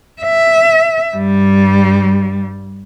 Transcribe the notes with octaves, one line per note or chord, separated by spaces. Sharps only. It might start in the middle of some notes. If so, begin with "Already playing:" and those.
E5
G2 G3